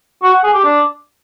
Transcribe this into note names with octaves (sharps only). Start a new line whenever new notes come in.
F#4
F#5
G#4
G4
D4